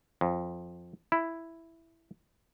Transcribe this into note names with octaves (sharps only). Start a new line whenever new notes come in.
F2
E4